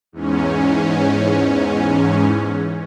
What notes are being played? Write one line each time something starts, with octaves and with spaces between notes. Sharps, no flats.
E2 G#2 C#4